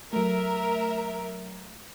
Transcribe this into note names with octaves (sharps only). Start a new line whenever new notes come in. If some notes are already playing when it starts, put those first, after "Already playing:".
F#3 A3 A#4 E5